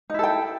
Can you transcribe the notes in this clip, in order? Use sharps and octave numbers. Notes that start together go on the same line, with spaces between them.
D#4 E4 A4 G5